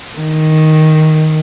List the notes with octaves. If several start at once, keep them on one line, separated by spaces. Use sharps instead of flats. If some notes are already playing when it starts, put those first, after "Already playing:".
D#3